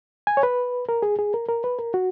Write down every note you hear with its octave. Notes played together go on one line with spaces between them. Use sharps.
G#5
C#5
B4
A#4
G#4
G#4
A#4
A#4
B4
A#4
F#4